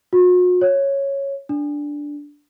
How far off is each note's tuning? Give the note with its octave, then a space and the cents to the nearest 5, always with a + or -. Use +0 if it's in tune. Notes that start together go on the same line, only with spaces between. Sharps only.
F#4 -45
C#5 -5
D4 -5